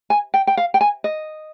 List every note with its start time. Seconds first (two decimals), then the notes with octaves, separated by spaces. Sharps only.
0.10 G#5
0.34 G5
0.47 G5
0.57 F5
0.74 G5
0.81 G#5
1.04 D#5